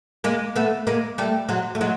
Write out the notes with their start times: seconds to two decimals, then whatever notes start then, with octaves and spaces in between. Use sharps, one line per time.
0.24 G#3 A#3
0.56 A3 B3
0.87 G#3 A#3
1.18 G3 A3
1.49 F#3 G#3
1.75 A3
1.81 F#3 G#3